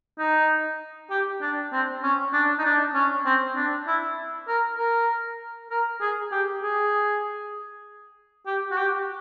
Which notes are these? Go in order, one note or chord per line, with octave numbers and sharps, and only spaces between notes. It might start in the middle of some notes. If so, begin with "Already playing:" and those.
D#4
G4
D4
C4
C#4
D4
D#4
D4
C#4
C4
D4
E4
A#4
A#4
A#4
G#4
G4
G#4
G4
F#4
G4